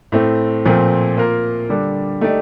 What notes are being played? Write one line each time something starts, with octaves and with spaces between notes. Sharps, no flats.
A2 A3 C4
A#2 F3 A3 C4
A#3 F4 A#4
D3 G3 D4 A4
A3 D#4 G4 D5